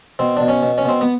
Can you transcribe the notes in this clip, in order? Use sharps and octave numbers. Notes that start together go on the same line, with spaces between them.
B2 C4
B2 D4
C#4
B2
C#4
B2 C4
B3